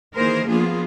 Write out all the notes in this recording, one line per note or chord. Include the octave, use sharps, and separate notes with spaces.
D#3 E3 A#3 G#4 A#4 C5
F3 A#3 B3 D4 F4 G#4